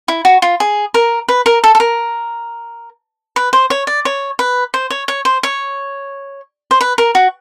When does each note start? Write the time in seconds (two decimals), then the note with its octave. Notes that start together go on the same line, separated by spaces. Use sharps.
0.08 E4
0.25 F#4
0.42 F4
0.60 G#4
0.94 A#4
1.29 B4
1.46 A#4
1.64 A4
1.75 A4
1.80 A#4
3.36 B4
3.53 C5
3.70 C#5
3.87 D5
4.05 C#5
4.39 B4
4.74 C5
4.90 C#5
5.08 C#5
5.25 C5
5.43 C#5
6.71 C5
6.81 B4
6.98 A#4
7.15 F#4